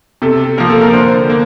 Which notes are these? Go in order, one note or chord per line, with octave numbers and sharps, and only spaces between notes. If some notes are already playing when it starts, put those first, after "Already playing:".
C3 A4
F3 A#3 A#4
A4
A#4
D3 C5
A#3